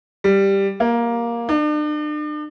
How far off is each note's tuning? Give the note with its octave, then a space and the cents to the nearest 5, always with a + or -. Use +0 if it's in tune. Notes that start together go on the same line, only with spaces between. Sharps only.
G3 +5
A#3 +10
D4 +40